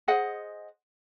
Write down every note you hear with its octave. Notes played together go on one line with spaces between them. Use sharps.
G#4 C5 D#5 F#5